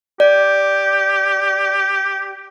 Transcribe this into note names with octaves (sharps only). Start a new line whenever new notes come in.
G4 D5